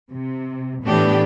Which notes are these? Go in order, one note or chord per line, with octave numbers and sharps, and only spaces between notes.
C3
A2 E3 B3 D4 G4